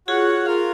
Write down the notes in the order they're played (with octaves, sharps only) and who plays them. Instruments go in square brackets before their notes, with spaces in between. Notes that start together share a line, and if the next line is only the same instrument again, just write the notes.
[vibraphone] F4 G#4 [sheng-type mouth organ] F#4 C#5 F#5
[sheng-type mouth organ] F4 A#4 F5